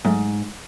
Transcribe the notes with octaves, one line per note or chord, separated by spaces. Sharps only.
G#2 F#3 A3